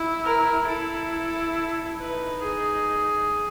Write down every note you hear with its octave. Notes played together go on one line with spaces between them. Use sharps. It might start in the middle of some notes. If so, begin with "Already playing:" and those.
Already playing: E4
A#4
E4 A4
D#4 B4
G#4